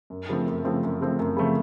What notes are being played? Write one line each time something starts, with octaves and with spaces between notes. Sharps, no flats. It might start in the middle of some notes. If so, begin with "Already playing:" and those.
F#2
C#3 F3 A3 C4
F#2
C#3 F3 A3 C4
F#2
C#3 F3 A3 C4
F#2
C#3 F3 A3 C4